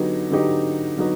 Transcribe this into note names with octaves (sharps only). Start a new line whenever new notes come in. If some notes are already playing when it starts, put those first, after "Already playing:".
Already playing: D3 F#3 B3 D#4 G4
D3 F#3 B3 D#4 G4
D3 F#3 B3 D#4